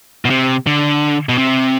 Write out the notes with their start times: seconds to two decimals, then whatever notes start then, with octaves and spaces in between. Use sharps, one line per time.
0.25 B2
0.30 C3
0.67 D3
1.29 B2
1.38 C3